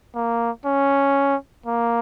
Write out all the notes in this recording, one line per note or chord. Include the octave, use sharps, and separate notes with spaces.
A#3
C#4
A#3